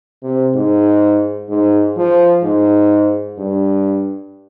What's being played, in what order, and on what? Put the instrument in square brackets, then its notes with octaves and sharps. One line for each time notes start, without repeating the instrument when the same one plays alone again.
[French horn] C3
G#2
G#2
F3
G#2
G2